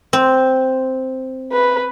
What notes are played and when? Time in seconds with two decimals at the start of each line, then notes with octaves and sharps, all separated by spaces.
0.13 C4
1.52 B4